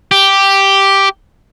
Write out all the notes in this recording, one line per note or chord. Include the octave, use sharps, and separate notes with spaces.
G4